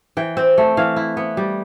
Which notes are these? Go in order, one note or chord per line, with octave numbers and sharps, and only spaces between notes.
E3 G5
C4
A3
E3 F5
E4
B3
G3